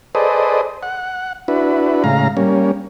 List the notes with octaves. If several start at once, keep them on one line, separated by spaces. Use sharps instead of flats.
G#4 A4 B4 C5 D5 D#5
F#5
D4 E4 F#4 B4
A2 C#3 G#3 F5 A#5
G3 A#3 C#4